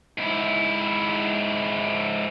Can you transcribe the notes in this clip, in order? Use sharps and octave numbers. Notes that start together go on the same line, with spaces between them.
G#2 E4